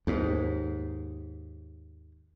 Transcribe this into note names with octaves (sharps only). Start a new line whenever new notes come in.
D#2 G#2